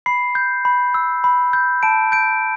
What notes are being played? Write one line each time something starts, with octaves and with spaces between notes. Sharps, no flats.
B5 C7
G6
B5
E6
B5
G6
A5 D7
G6 D7